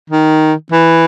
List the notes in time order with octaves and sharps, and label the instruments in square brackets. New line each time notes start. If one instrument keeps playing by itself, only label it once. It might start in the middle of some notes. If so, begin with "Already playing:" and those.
[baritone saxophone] D#3
E3